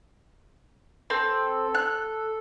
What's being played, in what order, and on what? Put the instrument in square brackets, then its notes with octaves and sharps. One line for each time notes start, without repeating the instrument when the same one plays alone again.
[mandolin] C4 [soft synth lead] A4
[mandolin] F#6